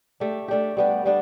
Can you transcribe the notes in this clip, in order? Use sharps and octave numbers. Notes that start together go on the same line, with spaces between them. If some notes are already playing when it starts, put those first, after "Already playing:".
A3 D4 G4
A3 D4 G4
G3 B3 D4 G4
G3 B3 D4